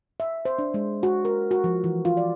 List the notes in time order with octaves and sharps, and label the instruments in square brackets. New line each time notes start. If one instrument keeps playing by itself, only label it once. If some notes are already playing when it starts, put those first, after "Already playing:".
[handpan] E5
C5
D4
G#3
F#4
A#4
F#4
F3
E3
F4
D5